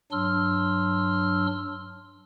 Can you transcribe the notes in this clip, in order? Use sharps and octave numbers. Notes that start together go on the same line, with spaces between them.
G2 F#3 D4 C6 E6 F6